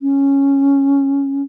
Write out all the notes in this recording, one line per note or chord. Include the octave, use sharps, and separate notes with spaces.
C#4